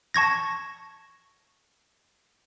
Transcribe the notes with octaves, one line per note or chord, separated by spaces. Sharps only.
A5 C#6 G#6 A#6